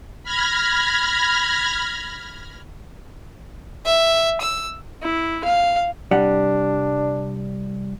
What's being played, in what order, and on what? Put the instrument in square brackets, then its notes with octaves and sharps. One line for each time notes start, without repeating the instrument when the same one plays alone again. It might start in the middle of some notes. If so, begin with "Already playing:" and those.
[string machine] B5 F6 G#6 A#6
[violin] E5
E6
[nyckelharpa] E4
F5
[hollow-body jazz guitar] C2 G3 F#5 [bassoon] D4